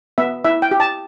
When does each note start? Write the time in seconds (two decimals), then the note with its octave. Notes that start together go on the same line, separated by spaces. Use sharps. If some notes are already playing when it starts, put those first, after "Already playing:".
0.18 B3 E5
0.44 E4 E5
0.62 G5
0.71 G4
0.80 A5